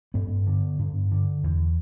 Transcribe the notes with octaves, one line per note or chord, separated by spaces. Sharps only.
G2 B3
D3
G2
D3
E2